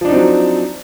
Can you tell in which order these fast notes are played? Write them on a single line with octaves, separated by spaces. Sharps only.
F3 D4 D#4 C4 F#3